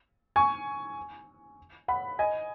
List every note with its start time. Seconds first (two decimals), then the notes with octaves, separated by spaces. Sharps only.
0.36 G#5 C#6
1.88 F#5 B5
2.19 D#5 G#5